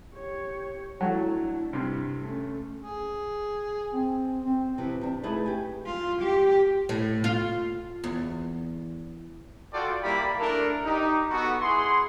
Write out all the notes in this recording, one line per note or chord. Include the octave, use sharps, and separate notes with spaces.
G4 C#5
F#3 A3 D4 E4 F#4
G2 C3
A3 C#4
G#4
C4
C4
C3 E3 F3
C3 D4
A3 D#4 E4 G#4 B4
G4 G#5
F4
G4
A2
F4
E2
F4 F#4 A4 D5 G5
G3 A#3 E4 G4 D5 B5
A3 D4 E4 A4 A#4
D#4 G4
B3 F#4 A4
E4 G#4 F#5 C6